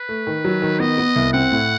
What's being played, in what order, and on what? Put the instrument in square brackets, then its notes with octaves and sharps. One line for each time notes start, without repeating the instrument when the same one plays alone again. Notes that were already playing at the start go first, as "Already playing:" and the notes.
Already playing: [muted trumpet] B4
[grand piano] A3
D#3
F#3
D#3
[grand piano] B3 [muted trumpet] D#5
[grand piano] B3
C2
[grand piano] C4 [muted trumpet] F#5
[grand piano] A2